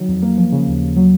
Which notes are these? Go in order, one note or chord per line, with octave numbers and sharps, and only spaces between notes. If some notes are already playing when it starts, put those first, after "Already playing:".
Already playing: D#3 F#3
F2
A#3
F3
C#3
D#2
D#2
F#3